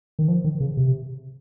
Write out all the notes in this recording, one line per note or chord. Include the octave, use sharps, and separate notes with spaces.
D#3
F3
D#3
C#3
C3